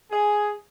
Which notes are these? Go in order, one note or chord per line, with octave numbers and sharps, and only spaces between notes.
G#4